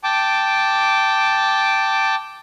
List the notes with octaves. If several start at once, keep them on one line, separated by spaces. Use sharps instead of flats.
G5 A5 D6